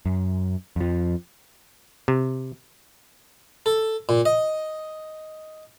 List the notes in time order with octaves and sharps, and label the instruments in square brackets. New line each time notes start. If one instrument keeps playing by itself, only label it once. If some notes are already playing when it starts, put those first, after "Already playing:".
[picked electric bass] F#2
F2 F3
[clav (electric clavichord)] C3
[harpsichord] A4
A#2
D#5